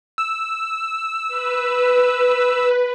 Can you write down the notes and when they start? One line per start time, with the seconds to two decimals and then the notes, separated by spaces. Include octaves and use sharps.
0.18 E6
1.28 B4